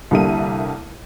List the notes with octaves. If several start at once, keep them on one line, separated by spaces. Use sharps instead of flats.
C2 D3 G3 A#3 E5 D#7